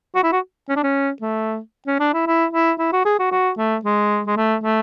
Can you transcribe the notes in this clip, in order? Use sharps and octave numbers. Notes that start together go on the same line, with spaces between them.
F#4
E4
F#4
C#4
D4
C#4
A3
C#4
D4
E4
E4
E4
E4
F#4
G#4
F#4
F#4
A3
G#3
G#3
A3
A3